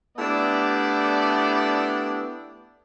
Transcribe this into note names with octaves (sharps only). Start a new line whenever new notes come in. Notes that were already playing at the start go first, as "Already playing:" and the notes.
A3 B3 D4 E4 G4 D5